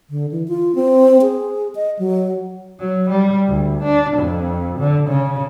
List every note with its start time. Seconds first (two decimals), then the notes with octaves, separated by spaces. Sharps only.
0.10 D3
0.31 E3
0.48 F4
0.75 C4
1.22 G#4
1.75 D#5
1.99 F#3
2.80 F#3
3.10 G3
3.47 D2
3.84 D4
4.18 F2
4.79 D3
5.09 C#3